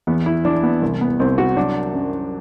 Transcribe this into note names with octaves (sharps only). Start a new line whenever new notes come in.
E2 B3
E4
E2 D4
B3
C2
B3
C2 C4
F#4
F#3 D4
F#2